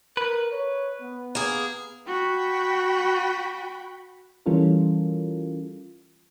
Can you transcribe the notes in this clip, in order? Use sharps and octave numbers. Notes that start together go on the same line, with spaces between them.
A#4 B4
C#5
B3
A#3 G#4
F#4 G5 B5
E3 G3 C#4 F4 A4 A#4